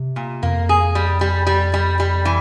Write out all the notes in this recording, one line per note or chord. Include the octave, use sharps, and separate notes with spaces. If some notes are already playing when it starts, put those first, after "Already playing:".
Already playing: C3
A#2
F2 A#3
G#4
G3
G3
G3
G3
G3
E3